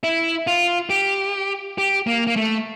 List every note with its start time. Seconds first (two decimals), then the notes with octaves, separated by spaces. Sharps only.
0.04 E4
0.47 F4
0.90 G4
1.78 G4
2.07 A#3
2.27 A#3
2.36 A3